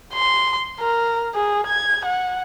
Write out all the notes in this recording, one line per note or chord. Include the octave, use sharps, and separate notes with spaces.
C6
A#4
G#4
G#6
F#5